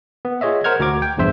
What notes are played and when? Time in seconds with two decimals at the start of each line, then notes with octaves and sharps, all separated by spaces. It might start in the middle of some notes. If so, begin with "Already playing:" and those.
0.25 B3
0.41 F4 G#4 C#5 D#5 E5
0.64 A#4 C5 F#5 F6 G#6
0.80 D2 F#4 A#5 D6 G#6
1.02 G5
1.17 A#1 E2 G2 C5 E5